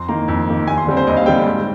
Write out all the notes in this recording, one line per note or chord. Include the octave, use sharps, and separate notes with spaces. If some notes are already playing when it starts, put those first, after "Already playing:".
Already playing: F2 C6
D#3 A#3 A#5
F2
D#3 A#3
D#2 G#5
C6
D3 G3 C4
C5
D#2 D#5
F5
D3 G3 C4 G5
G#2 G5